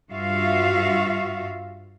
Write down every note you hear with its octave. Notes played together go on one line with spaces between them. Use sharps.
G2 F4 F#4 E5 F5